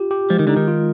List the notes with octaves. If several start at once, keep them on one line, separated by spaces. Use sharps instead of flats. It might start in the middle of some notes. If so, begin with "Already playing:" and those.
Already playing: F4 G4
G4
F3 G#3
D#3
D3 D#4
D#3
F4